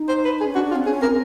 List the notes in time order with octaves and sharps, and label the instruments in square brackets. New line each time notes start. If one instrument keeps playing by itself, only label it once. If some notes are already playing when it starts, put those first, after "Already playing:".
Already playing: [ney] D#4
[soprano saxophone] C5
B4
G#4
[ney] C#4
[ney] D4 [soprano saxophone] F#4
[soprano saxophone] F4
[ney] C4
[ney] C#4 [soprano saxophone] G#4
[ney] C4 [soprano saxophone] A#4